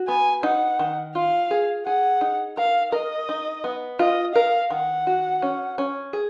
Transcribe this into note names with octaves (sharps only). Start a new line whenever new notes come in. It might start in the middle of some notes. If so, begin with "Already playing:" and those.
Already playing: F#4
B3 G#5
D#4 F#5
D#3
F4 F5
G#4
G#4 F#5
D#4
A#4 F5
A#4 D#5
D#4
B3
F4 D#5
A#4 F5
D#3 F#5
F#4
C#4
C#4
G#4